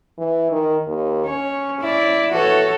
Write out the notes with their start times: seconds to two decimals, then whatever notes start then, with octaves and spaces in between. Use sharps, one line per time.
0.19 E3
0.51 D#3
0.87 D#2
1.26 C#4 C#5
1.81 E4 D5
2.33 E3 F#4 A4 C#5